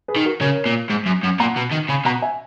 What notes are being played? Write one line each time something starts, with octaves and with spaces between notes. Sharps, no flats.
G#4 B4
D#3
F#4 A#4
C#3 A#4 C#5
A#2
G#2
F#2
F#2
A#2 F#5 A#5
B2
D#3
C#3 G#5 B5
B2 F#5 A#5
E5 G#5